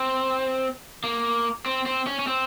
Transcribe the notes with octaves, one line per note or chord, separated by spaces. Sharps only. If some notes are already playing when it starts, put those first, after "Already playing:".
Already playing: C4
A#3
C4
C4
C#4
C#4
C4